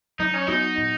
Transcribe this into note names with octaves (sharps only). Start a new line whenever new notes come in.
F#3 D#4
C#4
B3 D#4 F#4
A#2